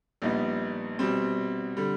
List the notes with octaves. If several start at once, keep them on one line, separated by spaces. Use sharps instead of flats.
A#1 A#2 G3 B3 D#4
B2 G3 C4
D3 G3